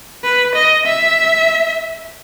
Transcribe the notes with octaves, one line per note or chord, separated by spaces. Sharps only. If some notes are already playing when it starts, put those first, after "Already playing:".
B4
D#5
E5